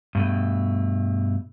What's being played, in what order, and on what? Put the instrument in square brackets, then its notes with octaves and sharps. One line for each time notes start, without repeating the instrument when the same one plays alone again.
[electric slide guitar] G2 B2 A3